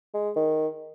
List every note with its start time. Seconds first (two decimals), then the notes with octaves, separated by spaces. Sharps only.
0.14 G#3
0.36 D#3